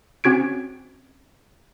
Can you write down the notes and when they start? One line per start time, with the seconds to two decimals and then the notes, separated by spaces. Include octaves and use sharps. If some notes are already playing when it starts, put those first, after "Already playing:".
0.24 C4 C#4 F#4 G#6 D7